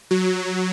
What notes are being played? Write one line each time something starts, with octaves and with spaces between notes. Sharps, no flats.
F#3